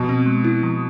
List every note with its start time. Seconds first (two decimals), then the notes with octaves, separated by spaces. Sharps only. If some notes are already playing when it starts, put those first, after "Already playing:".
Already playing: B2 F3
0.09 C4
0.26 G#3
0.44 E4
0.63 F3